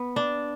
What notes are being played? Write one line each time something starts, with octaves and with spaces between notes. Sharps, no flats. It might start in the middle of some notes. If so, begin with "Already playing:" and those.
Already playing: B3
D4